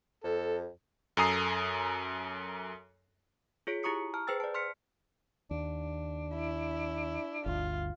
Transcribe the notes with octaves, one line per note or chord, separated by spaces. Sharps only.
F2 A4
F#2 A4 G#5 A#5 D#6 C7
F4 G#4 C#5 B6 D7
E4 G4 A#5 C#6 D#6 C#7
A5 A#5 F6
G#4 B4 C5 G5 E6 A6
D5 A5
C6 F6 B6 C#7
D#2 D4
E4
G1 D2 F4